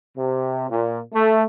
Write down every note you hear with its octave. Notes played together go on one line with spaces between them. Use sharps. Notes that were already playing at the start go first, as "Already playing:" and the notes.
C3
A#2
A3